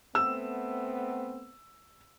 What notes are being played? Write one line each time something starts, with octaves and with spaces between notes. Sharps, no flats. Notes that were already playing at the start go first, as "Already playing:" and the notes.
A3 B3 C4 E6